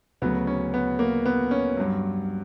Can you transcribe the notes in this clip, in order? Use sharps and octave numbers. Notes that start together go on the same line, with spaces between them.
D2 C#3 F#3 B3
C#4
B3
A#3
B3
C#4
G2 F#3